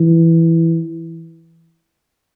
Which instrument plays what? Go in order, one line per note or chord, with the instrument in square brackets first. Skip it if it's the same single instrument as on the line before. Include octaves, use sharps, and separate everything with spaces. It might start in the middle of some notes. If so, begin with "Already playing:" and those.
Already playing: [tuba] E3